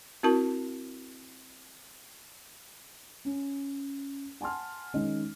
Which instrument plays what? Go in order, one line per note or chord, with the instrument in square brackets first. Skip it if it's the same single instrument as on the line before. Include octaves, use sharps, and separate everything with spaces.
[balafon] C4 E4 F#4 A#4 A5
[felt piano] C#4
F#5 G#5 A5 C6 F6
D#3 G#3 C#4 D#4 D#5